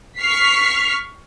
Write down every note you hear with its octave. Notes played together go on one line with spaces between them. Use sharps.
C#6 F6 B6 C7